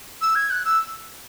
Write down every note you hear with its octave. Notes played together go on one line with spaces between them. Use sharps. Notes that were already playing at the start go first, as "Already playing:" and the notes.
E6
G#6
F#6
E6